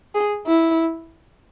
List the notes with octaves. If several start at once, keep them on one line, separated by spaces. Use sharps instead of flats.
G#4
E4